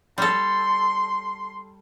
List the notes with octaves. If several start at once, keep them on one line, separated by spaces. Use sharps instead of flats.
G3 A4 C6